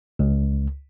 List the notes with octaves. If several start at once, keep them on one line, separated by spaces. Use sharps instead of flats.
C#2